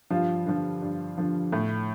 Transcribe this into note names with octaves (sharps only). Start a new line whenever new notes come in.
G2 F3 F4
D3 F3
G2
D3 F3
A2